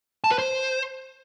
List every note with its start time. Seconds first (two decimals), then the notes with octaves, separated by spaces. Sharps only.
0.24 A5
0.31 B4
0.39 C5